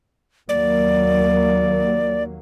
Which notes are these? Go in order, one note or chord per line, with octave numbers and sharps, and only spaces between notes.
D#2 F#3 A#3 D5